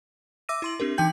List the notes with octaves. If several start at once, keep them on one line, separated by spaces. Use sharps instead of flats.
E5 D6 E6 A#6 D#7
E4 C6 F#7
C4 D4 G4 A#4
E3 D#4 G5 G6 F#7